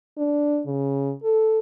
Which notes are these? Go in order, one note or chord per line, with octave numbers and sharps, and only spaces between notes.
D4
C#3
A4